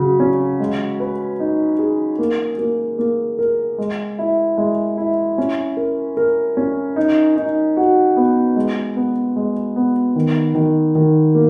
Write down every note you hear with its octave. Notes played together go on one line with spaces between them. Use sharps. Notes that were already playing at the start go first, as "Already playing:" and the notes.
Already playing: C#3 F#3
C#4
G#3
B4
D#4
G#4
A#3
A#3
A#3
A#4
G#3
E4
G#3
E4
C#4
A#4
A#4
C#4
D#4
D#4
F#4
B3
G#3
B3
G#3
B3
D#3
D#3
D#3
A#3